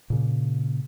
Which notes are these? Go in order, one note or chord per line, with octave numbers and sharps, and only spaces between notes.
A#2 C#3